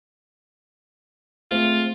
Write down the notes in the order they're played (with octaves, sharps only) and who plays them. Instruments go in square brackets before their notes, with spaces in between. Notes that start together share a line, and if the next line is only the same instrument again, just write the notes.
[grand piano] G#3 A3 C4 [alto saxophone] F4